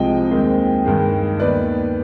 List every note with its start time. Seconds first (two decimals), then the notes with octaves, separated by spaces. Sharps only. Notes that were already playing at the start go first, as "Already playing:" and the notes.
Already playing: C2 C3 F3 G#3 C4 D#5 G5
0.31 D#2 D#3 G#3 C4
0.85 G2 D#3 G#3
1.39 D#2 D#3 B3 B4 D5